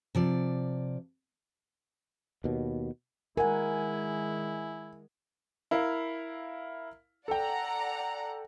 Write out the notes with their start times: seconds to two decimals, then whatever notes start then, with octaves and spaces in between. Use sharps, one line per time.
0.15 C3 F3 D5
2.44 D#2 B2
3.37 D#3 G#3 E4 A#4 F#5 G#5
5.71 E4 A#4 F5
7.28 A4 D5 F#5 G5 A#5